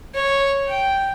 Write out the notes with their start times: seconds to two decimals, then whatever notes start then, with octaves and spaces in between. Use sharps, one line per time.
0.15 C#5
0.68 G5